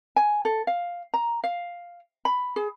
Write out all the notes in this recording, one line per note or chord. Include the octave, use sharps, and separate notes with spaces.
G#5
A4
F5
A#5
F5
B5
G#4